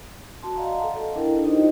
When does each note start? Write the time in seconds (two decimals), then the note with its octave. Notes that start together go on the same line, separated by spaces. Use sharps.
0.43 F#4 A5 C6
0.56 D5 D#5 F5 F#5 A5 A#5
0.83 A4
0.96 D#5
1.16 D4 E4 A4 A#4 D#5 G5
1.44 D#4 F4 G4 C5 D#5